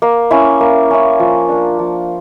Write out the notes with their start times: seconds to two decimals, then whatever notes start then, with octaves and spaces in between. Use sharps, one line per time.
0.02 A#3
0.31 C#4 E4
0.60 A#3
0.91 C#4 E4
1.19 F3
1.49 A#3 D4
1.79 F3